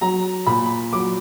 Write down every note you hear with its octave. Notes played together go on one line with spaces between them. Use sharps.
F#3 A#5
A#2 B5
F#3 D6